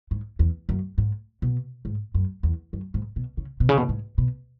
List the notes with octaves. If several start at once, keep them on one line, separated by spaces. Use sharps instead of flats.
G#2
E2
F#2
G#2
B2
G#2
F#2
E2
F#2
G#2
B2
C#3
B2
C#3
B2
G#2
B2